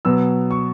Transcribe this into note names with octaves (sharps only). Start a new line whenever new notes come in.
B2 F#3 B3 E6
C#6